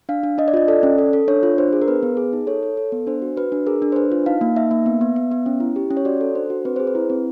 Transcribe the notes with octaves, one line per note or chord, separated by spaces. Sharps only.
D4 F5
D4
D4 D#5
D5
F4 D#5
A4 D5
C#4
A4
A4
D4 C#5
F4
D4 C5
G#4
A#4
B3 B4
B3
G#4
D#4
A4 C#5
A4
A4
B3
D4 C5
F#4
F#4 B4
D4
G#4 A#4
D4
C5
D4 B4
F4
D#4 F5
A#3
D#4 E5
A#3
B3
B3
B3
B3
C#4
E4
G4
C#4
C#5
F#4 D5
A4
D4 C5
F#4
C4 B4
G#4 C5
B4
E4
C4